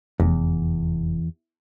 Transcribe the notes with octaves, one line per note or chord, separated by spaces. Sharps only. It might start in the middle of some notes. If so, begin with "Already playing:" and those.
F1 E2